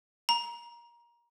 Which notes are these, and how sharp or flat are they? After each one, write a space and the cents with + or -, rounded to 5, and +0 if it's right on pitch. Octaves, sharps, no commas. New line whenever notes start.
A#5 +25